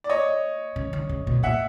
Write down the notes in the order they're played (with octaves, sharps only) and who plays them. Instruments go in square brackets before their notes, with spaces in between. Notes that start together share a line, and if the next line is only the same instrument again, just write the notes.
[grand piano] D5
C#5 D#5
[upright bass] C#3
D3
C#3
B2
[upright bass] A#2 [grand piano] E5 F#5